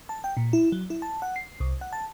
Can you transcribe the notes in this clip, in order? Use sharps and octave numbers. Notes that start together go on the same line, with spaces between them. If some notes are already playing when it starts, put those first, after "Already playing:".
A5
G5
A#2
E4
F#3
E4
A5
F#5
C7
C2
F#5
A5